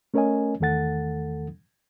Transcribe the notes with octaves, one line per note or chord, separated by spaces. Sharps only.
A3 C#4 A#4 C#5 D#5 G#5
E2 D#3 A3 A4 F#5 A6